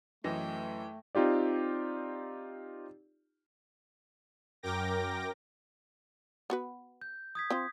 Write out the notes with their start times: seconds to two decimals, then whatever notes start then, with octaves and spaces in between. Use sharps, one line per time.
0.24 F#2 E3 A3 D#5 G5 A#6
1.15 C4 D#4 F4 G4 D5
4.63 F#2 A#4 G5 D6 A#6
6.50 B3 F#4 B4
7.02 G6
7.35 D#6 G#6 B6
7.50 C4 F4 C5